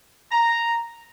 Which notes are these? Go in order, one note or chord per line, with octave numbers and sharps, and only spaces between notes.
A#5